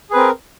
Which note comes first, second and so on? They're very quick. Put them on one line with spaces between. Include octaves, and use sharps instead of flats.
G#4 B4 C4 A#4